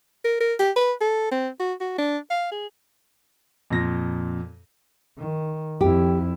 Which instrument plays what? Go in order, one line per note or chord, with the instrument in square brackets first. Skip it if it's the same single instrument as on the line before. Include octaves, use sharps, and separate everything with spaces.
[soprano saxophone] A#4
A#4
G4
B4
A4
C4
F#4
F#4
D4
F5
G#4
[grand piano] F2 A#2 A#6
[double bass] D#3
[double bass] F2 E4 [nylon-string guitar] G4